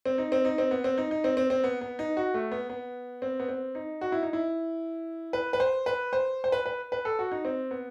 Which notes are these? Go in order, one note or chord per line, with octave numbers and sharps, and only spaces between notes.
C4
D#4
C4
D#4
C4
B3
C4
D#4
D#4
C4
C4
C4
B3
B3
D#4
F#4
A3
B3
B3
C4
B3
C4
D#4
F#4
E4
D#4
E4
B4
B4
C5
B4
C5
C5
B4
B4
B4
A4
F#4
D#4
C4
B3